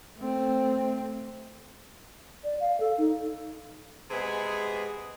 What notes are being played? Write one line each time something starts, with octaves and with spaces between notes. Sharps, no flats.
A3 C4
D5
F5
A4
D#4
C3 G#3 B3 G#4